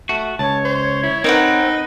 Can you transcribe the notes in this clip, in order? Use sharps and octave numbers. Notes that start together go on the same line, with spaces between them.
A3 F#4
C#2 C#5 A5
C5
E4
C4 D#4 A#4 B4 F#5
D#5